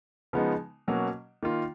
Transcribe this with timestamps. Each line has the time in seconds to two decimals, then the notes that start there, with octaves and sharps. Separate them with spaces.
0.33 C#3 F3 G#3 B3 D#4
0.88 B2 F#3 A#3 C#4
1.43 D#3 A#3 F4